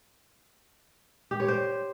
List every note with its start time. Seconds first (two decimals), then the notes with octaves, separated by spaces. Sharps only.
1.31 G4
1.40 C#5
1.48 C5